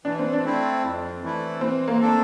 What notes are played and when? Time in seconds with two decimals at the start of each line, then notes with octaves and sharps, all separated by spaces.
0.05 E3 D4
0.19 C4
0.33 D4
0.44 A3 C4 E4
0.83 F2
1.22 E3 A3 E4
1.61 E3 C4
1.88 A#3
2.01 A3 D4 A4